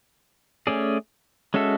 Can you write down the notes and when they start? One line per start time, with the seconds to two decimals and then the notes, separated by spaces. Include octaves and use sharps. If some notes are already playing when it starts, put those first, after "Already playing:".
0.67 A3 C#4 G#4 D5
1.54 G#3 C#4 F#4 A4 E5